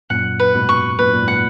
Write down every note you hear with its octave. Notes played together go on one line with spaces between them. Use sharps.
F#2 A#2 F#5
B4
G#2 B2
C#6
F#2 A#2 B4
A#2
G#2
F#5